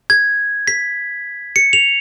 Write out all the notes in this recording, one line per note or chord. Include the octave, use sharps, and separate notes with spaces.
G#6
B6
C#7
F7